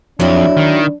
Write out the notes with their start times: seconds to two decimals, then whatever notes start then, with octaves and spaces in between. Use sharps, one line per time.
0.20 F2 F#3 D4 E4
0.57 D#3